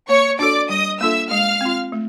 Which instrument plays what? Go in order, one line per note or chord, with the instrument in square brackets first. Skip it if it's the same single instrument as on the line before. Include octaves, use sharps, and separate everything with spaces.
[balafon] A#3 [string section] C#5 C#6
[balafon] D4 F#4 A4 C#5 [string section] D5 D6
[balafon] G3 [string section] D#5 D#6
[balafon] A#3 D4 F4 A4 [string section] E5 E6
[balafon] G#3 [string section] F5 F6
[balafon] C4 F4
A3